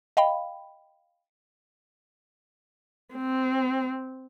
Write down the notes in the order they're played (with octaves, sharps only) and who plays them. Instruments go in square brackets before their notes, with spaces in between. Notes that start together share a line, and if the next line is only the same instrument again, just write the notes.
[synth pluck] D#5 F5 G5 B5
[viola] C4